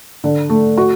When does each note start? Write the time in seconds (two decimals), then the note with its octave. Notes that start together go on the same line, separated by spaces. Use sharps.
0.24 D3
0.50 A3
0.78 F#4